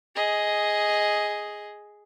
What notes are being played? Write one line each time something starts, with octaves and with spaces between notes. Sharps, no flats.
G#4 D#5